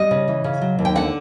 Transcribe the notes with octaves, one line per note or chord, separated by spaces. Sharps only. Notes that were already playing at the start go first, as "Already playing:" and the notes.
Already playing: G3 D#5
C#3
E3
C#3
F#3
D#2
G5
D3 F#5